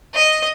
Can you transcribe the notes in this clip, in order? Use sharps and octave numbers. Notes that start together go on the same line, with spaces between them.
D#5